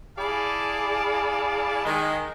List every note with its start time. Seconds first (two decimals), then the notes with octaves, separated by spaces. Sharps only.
0.19 E4 G#4 D5 F5 A5
1.85 D#3 G#3